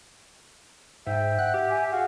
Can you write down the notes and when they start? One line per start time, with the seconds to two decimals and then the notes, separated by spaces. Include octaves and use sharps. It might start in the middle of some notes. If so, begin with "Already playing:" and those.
1.06 G#2 E5 G5
1.39 F#5 F#6
1.54 G4
1.70 G#5
1.92 F#4 G#4 F5 F#5